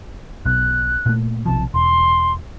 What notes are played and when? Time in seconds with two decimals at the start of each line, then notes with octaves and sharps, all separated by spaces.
0.46 B1 B2 F#6
1.06 A#2 A3
1.46 B1 C3 F3 A5
1.74 E1 C6